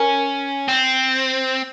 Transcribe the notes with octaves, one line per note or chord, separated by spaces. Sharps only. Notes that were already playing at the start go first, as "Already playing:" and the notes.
Already playing: C#4 A#4
C4